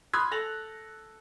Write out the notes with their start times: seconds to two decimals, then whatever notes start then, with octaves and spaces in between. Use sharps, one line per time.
0.14 B5 C6 D#6 F6 F#6 G#6
0.31 A4 A6 A#6 F7 F#7